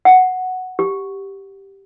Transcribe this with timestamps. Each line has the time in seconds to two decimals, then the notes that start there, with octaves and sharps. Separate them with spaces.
0.05 F#5
0.79 G4